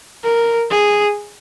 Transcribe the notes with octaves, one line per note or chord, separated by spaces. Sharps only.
A#4
G#4